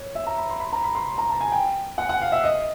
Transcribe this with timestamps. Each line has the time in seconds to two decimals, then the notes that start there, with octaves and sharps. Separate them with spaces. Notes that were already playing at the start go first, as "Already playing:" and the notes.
Already playing: C#5
0.15 E5
0.27 A#5
0.38 B5
0.50 C6
0.60 B5
0.73 A#5
0.84 B5
0.95 C6
1.18 A#5
1.29 A5
1.41 G#5
1.52 G5
1.98 F#5
2.09 F#5
2.21 F5
2.32 E5
2.44 D#5